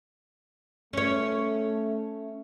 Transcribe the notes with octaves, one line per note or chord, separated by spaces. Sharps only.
A3 C#4 C#5